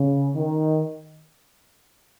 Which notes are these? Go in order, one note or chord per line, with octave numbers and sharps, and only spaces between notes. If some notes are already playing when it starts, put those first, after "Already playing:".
Already playing: C#3
D#3